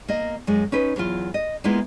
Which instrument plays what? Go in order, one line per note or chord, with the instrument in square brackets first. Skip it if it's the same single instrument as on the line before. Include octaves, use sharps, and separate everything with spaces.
[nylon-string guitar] A#3 D#5
F#2 G#3
C#4 D#4 B4
E2 F#3 E4 F4
D#5
G#3 A#3 B3 E4 F4